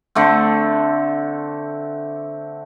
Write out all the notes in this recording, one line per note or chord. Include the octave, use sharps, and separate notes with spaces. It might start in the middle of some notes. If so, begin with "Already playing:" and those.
D3 A3 C4